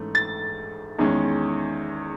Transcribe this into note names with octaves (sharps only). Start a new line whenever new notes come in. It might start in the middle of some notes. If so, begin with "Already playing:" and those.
Already playing: G#2 E3 A3 C#4
A6
E2 D#3 G#3 C#4